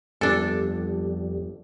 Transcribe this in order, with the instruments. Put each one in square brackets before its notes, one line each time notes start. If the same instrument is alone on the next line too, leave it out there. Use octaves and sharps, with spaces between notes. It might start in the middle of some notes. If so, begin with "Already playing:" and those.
[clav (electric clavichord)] G1 [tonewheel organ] F2 G3 [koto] D4 A4